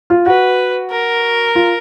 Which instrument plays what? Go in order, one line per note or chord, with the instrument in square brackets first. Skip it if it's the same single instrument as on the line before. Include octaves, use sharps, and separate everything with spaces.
[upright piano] F4
[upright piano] F#4 [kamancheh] B4
[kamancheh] A#4
[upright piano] F4